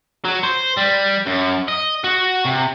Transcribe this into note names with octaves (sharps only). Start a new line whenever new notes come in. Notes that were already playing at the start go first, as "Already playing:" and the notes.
F#3
C5
G3
F#2
D#5
F#4
C3